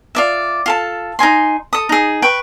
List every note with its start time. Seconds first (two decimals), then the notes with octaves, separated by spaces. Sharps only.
0.15 F4 D5 E5
0.66 F4 A4 A5
1.19 D#4 A4 G#5 C6
1.73 A4 D#6
1.89 D#4 G#4
2.22 B4 G5 C#6